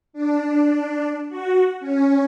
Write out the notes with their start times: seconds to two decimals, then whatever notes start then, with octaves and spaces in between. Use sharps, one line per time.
0.13 D4
1.29 F#4
1.80 C#4